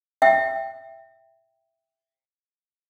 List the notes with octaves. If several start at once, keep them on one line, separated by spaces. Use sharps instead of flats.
E5 G5